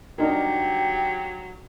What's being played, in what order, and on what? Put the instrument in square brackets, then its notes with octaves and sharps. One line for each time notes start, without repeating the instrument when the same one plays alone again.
[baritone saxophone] F#3 [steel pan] D4 D#4 A#4 [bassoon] G4